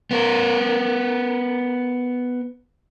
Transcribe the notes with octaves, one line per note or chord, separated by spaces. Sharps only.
B3 A#4